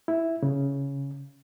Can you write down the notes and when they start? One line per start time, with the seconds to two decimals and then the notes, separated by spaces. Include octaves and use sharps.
0.08 E4
0.42 C#3